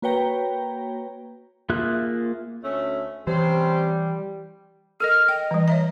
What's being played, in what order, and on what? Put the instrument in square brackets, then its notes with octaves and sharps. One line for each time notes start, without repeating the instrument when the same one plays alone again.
[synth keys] A#3 F#4 B4 C#5 G5 A#5
[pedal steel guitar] A#3 F4 G#4 E5 F#6
[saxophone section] D2 A3 C#4
[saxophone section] C3 C#4 C5 [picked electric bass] E3 [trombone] G3
[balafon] A4 A#4 D#5 [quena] F6
[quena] D#5 [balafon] G5
[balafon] E3 G3
C#5 E5 A#5